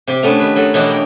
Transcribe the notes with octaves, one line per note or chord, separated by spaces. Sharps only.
C3 G4
A3 B3 C#4 D4
D#3 B4
F#3 A4
B2 E3 F#3 D4 D#4 C#5
A#4 G5